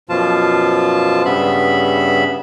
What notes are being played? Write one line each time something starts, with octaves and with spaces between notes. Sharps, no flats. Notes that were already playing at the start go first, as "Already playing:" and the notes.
F#2 B2 F3 F4 A5
G2 C#3 B3 E5 B5